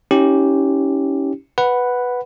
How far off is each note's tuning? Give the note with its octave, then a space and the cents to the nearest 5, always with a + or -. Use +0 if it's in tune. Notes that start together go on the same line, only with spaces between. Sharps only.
C#4 +0 E4 -45 G4 -5
B4 +0 F#5 +0 B5 +0